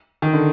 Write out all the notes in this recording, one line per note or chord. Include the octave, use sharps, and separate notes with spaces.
D#3
D3